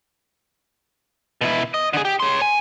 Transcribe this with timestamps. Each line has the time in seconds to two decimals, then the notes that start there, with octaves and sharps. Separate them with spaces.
1.41 B2 E4
1.74 D#5
1.93 D3 G#4
2.05 G4
2.20 C#5 C6
2.42 G#5